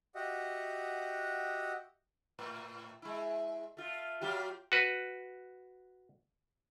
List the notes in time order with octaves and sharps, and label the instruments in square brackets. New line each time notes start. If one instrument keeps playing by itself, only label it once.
[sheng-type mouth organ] F#4 G4 D#5 E5 F#5
[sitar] A2
G#3 E4
A3 F4
F#3 F4 G4
[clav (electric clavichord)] F#4 B4